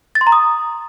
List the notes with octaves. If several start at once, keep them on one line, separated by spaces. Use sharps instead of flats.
A6
C6
A#5
D#6